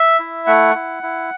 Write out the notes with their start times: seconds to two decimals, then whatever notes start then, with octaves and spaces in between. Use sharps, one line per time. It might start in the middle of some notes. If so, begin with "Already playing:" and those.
Already playing: E5
0.20 E4
0.47 A3 F#5
0.75 E4
1.03 E4